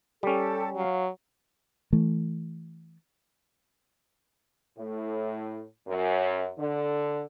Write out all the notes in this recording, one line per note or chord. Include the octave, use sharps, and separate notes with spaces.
G3 C#4 G4 A4
F#3 F5
E3 A3
A2
F#2
D3